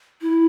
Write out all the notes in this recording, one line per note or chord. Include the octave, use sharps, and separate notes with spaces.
E4